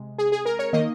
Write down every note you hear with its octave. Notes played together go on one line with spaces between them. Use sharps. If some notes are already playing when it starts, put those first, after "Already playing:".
Already playing: C3 G#3
G#4
G#4
A#4
C#5
D#3 A#3 D#5